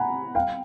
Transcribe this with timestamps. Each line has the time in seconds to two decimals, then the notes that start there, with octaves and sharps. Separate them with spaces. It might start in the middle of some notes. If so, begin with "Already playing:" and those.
Already playing: F#5 G#5 A#5 B5
0.35 F5 G5